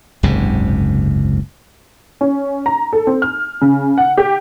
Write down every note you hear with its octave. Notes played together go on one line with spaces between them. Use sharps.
F#1 C#2 G#2 C3
C#4
A#5
A4
C4
F6
C#3
F#5
G4